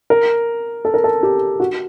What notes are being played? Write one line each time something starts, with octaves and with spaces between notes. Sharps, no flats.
A#4
A4
A#4
A4
G4
F#4